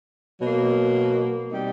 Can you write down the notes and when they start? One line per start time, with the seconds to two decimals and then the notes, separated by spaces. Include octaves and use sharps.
0.39 B2 F#3 A#3
1.51 B2 G3 C4 D#4 G4